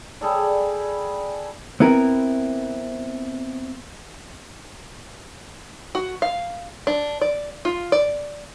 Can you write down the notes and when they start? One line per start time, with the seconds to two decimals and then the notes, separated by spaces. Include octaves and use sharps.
0.21 G3 G#4 A4 D5
1.80 B3 C4 E4 A#4
5.95 F#4
6.22 F5
6.87 D4
7.21 D5
7.65 F4
7.92 D5